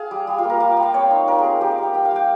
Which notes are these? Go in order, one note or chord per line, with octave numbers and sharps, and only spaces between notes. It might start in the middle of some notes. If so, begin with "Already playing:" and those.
Already playing: G#4 F5
G3
G3
F4
A#3
A#4
G3 F5
G5
G3
F5
C4 C#5
D#4
G3 A#4
G#4
C4
G3 G4
F5
C4 G5
G3 G5
F5
G3 G5